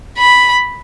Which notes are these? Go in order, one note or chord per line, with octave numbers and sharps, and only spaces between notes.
B5